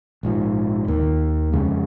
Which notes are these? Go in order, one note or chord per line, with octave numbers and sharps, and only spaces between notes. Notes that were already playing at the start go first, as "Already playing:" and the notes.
A#1 G#2 F3
D#2 D#3 A#3
F2 C#3 G#3